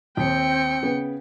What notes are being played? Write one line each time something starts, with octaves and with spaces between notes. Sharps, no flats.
D#2 C4 G5 C#7
C#3 B3